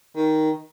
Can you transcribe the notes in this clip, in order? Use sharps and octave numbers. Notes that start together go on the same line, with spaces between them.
D#3